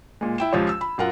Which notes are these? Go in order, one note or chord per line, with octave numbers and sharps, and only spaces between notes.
A#2 G#3
E4 G5 E7
C#2 F3 F4 G4 C5 C#5
E6
B5
F#2 F4 A#4 F#5